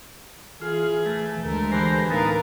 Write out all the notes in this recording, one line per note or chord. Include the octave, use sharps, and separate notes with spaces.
E3 F4 G#4
A3
D2 G#3 A4 A#4
E3 G4 C5 A#5
A2 B3 D#4 A4 A#4 F5